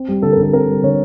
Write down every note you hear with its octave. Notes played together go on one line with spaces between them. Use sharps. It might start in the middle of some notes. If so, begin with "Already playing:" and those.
Already playing: C4
G3
D3 A4
A#4
D3 A4
C4 A#4
G3
D3 C#5